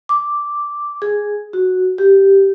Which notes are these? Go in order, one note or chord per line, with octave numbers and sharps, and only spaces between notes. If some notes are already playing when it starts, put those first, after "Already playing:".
D6
G#4
F#4
G4